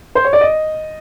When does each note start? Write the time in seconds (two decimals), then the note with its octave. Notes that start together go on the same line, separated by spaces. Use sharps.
0.15 C5
0.24 C#5
0.33 D5
0.41 D#5